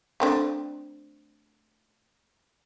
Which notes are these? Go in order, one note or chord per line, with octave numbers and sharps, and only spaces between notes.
A3 C4 D4